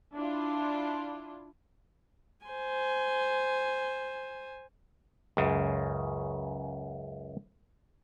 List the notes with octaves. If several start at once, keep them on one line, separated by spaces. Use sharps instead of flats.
D4 E4 F4
C5 G#5
C#2 F#2 C#3